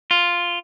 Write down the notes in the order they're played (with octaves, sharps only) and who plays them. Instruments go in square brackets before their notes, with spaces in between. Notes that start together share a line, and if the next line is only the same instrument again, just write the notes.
[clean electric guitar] F4